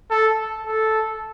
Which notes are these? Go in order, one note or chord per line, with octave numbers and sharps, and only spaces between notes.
A4
A4